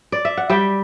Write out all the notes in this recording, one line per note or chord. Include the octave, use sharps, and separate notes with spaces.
D5
E5
F#5
G3 E5 G5